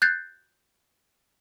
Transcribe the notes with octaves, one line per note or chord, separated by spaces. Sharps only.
F#6 G6 A6 C7